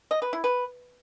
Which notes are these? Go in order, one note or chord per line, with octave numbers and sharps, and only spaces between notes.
D#5
B4
E4
B4